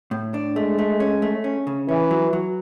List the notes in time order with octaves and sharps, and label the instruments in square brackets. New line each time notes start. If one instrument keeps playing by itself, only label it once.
[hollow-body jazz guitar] A2
D4
[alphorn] G#3 [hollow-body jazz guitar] A3
[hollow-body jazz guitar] A3
C#4
A3
C#4
C#3
[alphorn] E3 [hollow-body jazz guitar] C#4
[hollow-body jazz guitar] F#3
F#3